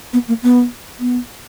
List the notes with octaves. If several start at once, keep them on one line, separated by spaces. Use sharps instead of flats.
B3
A#3
B3
B3